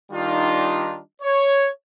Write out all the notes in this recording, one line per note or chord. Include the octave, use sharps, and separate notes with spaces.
D#3 G3 D4 D#4 F4
C#5